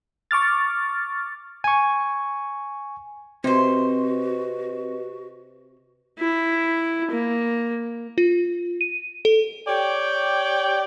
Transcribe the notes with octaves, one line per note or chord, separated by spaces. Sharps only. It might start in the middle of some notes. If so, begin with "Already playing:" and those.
C#6 D6 F6 A6
G#5 C#6
C3 C4 F#4 G4 B4 C5 D#5
E4
A#3
F4
D#7
A4
G4 C#5 D5 G5